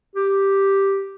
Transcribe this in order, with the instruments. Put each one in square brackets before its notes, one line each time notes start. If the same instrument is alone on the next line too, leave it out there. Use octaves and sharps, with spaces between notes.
[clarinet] G4